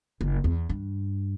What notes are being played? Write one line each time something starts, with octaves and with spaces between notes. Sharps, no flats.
F#1
E2
G2